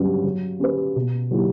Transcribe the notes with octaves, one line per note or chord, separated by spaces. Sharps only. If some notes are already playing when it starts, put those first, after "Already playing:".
Already playing: G2 F#3 C#4 G4 B4
F#3
C#4 G4 B4
B2
F#3 A#3 E4 G4